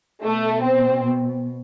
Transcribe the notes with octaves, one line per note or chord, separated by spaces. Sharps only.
B2 A3
C4